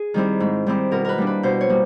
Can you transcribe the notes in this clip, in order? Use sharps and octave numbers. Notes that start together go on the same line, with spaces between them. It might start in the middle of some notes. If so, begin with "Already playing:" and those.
Already playing: G#4
D#3 G3 C4 E4
G#2
D#3 G3 C4 E4
B2 A#4
A#4 B4
G3 A#3 D4
B4
B2 C5
C#5
G3 A#3